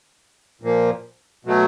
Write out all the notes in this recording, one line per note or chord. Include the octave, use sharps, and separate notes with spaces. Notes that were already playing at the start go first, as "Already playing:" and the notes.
A#2 F3 A#3
B2 F#3 A3